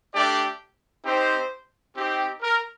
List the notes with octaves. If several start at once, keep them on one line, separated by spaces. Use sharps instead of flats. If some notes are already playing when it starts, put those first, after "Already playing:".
A3 D4 G4 D5
C4 D#4 G4 C5
C4 D#4 G4
A#4